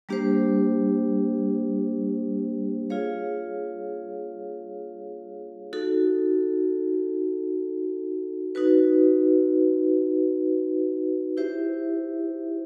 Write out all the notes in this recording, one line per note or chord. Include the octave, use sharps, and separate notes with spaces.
G3 A#3 D4 G4 C5
F4 G#4 C#5 F5
D#4 F#4 A4
D#4 F#4 B4
E4 G4 C5 E5